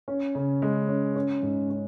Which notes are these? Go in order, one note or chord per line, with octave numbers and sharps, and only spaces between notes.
C#4
C#3
G#3
C#4
C#4
G#2
C#4